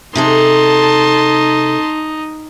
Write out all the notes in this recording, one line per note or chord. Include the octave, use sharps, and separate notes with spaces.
C3 D#4 G#4 A4 A5 C6